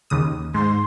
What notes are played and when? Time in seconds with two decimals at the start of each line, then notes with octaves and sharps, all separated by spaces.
0.10 D#2 C#3 D#6
0.54 G#2 C6